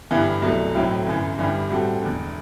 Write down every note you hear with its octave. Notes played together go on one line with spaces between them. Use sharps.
G1 G2 E3 B3 E4
C2 B2 F#3 A3
B1 A2 F#3 C4 E4
G1 F#2 E3
G1 G2 E3 G3
A2 G3 C4 F#4 A4
E1 E2 D3